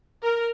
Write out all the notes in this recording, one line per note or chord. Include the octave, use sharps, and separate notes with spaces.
A#4